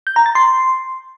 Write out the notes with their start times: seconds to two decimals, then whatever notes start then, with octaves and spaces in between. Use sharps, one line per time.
0.07 G6
0.16 A#5
0.26 A6
0.35 C6